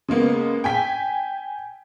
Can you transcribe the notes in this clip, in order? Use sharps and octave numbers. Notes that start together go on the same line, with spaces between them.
C#3 G#3 A#3 B3
G5 G#5 B6